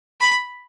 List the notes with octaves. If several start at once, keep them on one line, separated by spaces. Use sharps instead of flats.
B5